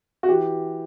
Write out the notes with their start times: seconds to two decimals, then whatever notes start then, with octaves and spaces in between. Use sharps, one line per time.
0.23 F#4
0.29 E3 G4